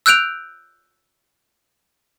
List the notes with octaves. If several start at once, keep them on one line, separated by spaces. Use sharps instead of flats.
E6 F#6 G6 D7 F7